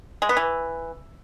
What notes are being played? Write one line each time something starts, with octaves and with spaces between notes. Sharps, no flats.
G#3
B3
E3